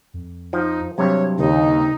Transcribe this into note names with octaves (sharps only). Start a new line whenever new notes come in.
F2
F3 D#4
G2 C3 F#3 C#5
D#2 C#3 D#4